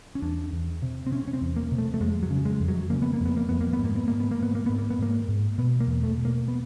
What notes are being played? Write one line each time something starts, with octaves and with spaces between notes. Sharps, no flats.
C#4
E2 D4
E2
C3
C4
C3 C#4
C#4
C4
E2
A#3
C3
A3
A3
F2 G#3
F#3
C#3
G#3
F2
F#3
C#3 A#3
B3
A#3
F2
B3
A#3
F2 B3
A#3
B3
G#2
A#3
B3
G#2 A#3
B3
A#3
G#2 B3
A#3
G#2 B3
A#3
B3
G#2 A#3
G#2
B2 B3
A#3
E2
A3
B2
A#3
B3